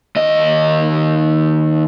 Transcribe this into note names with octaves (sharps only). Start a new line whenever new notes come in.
D#2 D#5